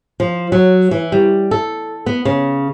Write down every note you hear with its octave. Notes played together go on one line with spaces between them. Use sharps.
F3
F#3
E3
G3
A4
B3
C#3